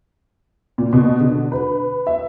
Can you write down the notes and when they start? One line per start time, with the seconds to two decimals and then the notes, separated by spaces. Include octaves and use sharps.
0.78 A#2
0.93 B2
1.20 D3
1.52 B4
2.07 E5